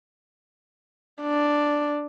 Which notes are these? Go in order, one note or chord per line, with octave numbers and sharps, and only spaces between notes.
D4